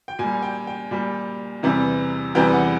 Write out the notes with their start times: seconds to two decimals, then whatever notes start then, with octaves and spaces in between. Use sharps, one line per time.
0.08 G5
0.19 A#2 G3 G#5
0.42 G5
0.67 G5
0.91 A#2 G3
1.63 E2 C3 E3 G3
2.35 E2 C3 E3 G3 G5
2.53 F#5